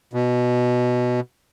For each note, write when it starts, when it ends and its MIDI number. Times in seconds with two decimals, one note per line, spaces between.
0.13 1.20 47